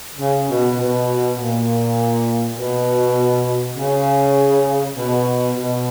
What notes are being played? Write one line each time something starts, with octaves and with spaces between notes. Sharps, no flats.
C#3
B2
B2
A#2
B2
C#3
B2
B2